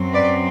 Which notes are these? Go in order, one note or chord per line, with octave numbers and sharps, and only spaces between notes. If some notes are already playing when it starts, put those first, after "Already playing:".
Already playing: F#2 F#3 C4
B4 D5